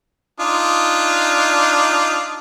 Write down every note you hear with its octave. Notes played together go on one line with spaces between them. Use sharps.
D4 D#4 F4